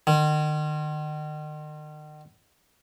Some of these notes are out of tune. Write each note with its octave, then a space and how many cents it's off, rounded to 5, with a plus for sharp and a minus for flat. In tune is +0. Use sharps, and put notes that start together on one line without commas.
D#3 -40